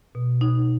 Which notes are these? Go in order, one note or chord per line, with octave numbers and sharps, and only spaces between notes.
B2
D#4